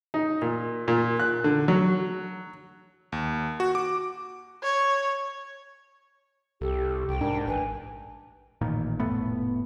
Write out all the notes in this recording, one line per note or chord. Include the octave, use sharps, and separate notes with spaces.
D#4
A#2
A#2
F#6
D3
F#3
D#2
F#4
D6
C#5
C2 G4 A4
C2 G5
G#2 D4 A#4
A1 B4 G#5
A1 A#2 D#3
F1 A2 A3 B3